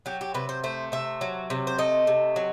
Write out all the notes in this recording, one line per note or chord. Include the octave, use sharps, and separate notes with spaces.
F#3 G4
G4
C3 B4
C5
A3 C5
C3 E5
F#3
C3
C5
A3 D#5
C3
F#3